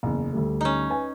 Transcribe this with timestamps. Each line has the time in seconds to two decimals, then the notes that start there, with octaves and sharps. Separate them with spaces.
0.03 F#1 E2
0.32 D2 G3 A3
0.61 C#4 D#4
0.90 B4 G#5